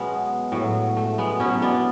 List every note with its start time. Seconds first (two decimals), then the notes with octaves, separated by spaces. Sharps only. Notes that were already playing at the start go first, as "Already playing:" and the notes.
Already playing: B2 F#3 G#3 B3 C#4
0.52 A2 F#3
0.97 A3
1.18 G#3 B3
1.40 B2 F#3 C#4 E4
1.62 B3 D4